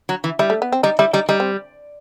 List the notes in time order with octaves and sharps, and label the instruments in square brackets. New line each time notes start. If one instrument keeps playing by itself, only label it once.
[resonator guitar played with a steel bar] F#3
E3
[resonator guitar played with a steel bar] G3 [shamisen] E4
[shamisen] A3
B3
C4
[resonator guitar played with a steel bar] G3 [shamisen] D#4
[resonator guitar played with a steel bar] G3 [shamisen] E4
[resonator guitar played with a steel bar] G3 [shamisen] D#4
[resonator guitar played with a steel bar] G3 [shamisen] D#4
[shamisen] C4